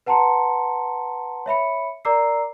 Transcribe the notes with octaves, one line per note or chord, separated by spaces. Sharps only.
B4 F#5 A5 A#5 C6 C#7
C#5 E5 B5 C#7
A#4 D5 A#5 D6 E6 C7